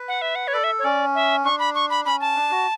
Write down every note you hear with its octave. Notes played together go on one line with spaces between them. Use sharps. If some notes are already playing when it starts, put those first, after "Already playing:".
Already playing: B4
F#5
E5
F#5
C#5
A4 D5
E5
C#5
C#4 D5
E5
D4 C#6
B5
C#6
B5
C#4 B5
A5
D4
F#4